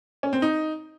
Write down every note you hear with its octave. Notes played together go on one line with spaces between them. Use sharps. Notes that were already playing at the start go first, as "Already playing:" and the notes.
C#4
C4
D#4